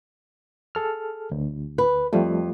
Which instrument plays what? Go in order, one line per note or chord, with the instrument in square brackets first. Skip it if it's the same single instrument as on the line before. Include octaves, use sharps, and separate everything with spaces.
[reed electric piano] G#4 A4 F6
D2
[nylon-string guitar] B4
[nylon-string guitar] F2 [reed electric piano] F3 G3 A3